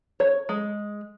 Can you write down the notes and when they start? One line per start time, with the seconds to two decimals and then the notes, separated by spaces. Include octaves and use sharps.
0.20 C#5
0.49 G#3